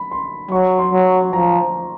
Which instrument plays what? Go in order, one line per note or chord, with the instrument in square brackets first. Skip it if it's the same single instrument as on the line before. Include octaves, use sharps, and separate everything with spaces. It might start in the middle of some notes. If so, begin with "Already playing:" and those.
Already playing: [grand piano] B5
C6
[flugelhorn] F#3 [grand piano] C#6
[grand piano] C6
[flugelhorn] F#3
[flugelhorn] F3 [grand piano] A#5